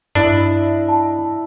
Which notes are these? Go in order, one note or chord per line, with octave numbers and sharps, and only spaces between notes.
G2 D4 E4 D#5
A5